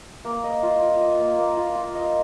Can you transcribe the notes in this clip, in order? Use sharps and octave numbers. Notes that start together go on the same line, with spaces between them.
A#3
D#5
F4
F4
D#5
A#3
A#3
F4
F4
D#5